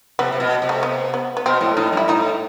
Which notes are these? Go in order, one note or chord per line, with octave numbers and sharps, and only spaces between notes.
C3 B3
C3
B2
C3
A3
B3
B3
B3
B2 C4
A2
A2 D#4
G2 E4
A2 D#4